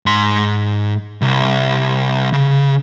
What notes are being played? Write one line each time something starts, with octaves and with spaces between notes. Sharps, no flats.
G#2 C6
C2
C#3